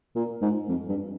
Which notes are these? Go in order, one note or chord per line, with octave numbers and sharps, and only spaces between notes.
A#2
G#2
F2
G2